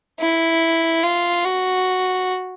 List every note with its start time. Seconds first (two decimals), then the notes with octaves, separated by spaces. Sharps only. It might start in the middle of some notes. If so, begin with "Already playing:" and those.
0.21 E4
1.04 F4
1.45 F#4